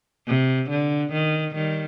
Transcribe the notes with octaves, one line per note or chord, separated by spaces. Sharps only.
C3
D3
D#3
D#3 G3